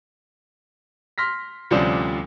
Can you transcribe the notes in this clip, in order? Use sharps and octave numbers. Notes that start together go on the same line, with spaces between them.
C6 F6 A#6 B6
D2 C3 F3 G3 C#4 D4